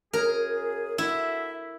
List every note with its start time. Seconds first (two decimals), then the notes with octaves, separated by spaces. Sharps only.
0.13 F#2 G#4 A#4
0.98 E4 F#4 A4 E5